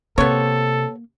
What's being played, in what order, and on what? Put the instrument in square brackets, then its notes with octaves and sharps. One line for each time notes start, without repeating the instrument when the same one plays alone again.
[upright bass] C3 [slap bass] A#3 [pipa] B3 C#5 [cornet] A4